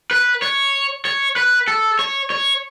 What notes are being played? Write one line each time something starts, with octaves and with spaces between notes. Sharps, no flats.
B4
C#5
C#5
B4
A4
C#5
C#5